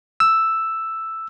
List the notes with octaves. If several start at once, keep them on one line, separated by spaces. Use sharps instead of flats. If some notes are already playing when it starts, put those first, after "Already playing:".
E6